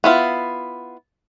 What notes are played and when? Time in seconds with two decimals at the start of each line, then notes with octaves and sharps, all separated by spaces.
0.04 B3 E4 F4